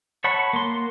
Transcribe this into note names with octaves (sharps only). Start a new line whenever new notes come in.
C#5 F#5 A5 B5 C#6
A#3 C6